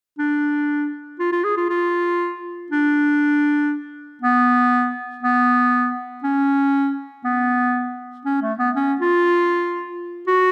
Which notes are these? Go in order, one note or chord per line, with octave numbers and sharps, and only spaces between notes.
D4
F4
F4
G#4
F4
F4
D4
B3
B3
C#4
B3
C#4
A3
B3
C#4
F4
F#4